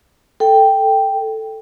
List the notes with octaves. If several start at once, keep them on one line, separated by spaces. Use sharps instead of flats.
A4 G5